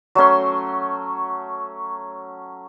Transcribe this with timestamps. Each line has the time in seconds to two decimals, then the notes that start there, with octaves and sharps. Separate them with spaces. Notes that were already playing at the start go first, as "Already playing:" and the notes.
0.15 F#3 A3 C#4 C6